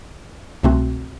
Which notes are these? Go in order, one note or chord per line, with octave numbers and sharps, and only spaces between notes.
C2 B2 A3 C4 F#4